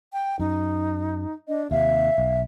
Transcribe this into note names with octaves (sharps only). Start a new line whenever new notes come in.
G5
F#2 D#4
D4 D#5
D#2 C3 E5 F5
B1